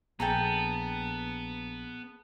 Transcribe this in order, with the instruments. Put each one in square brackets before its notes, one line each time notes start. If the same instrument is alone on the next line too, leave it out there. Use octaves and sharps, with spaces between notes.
[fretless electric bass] A#1 [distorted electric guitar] B3 [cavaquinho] G#4 A4 G5 [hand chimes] A#5 A6